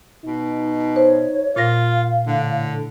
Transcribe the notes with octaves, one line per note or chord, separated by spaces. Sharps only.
B2 D#4
C5 C#5
A#2 F4 F5 A#6
A2 D3